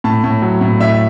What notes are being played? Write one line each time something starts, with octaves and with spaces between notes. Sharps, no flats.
A2 A5
A2
F#3
A2
A2 E5